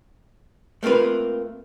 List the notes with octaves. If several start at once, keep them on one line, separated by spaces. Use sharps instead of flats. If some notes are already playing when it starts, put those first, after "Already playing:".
A3 A#3 C4 F4 B4